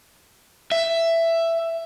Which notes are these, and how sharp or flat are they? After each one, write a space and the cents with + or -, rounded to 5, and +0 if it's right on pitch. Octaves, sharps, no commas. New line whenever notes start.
E5 +10